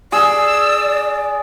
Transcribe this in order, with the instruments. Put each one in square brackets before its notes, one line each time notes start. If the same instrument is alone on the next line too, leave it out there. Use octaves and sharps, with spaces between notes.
[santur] G#4 [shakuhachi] D5 [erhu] E6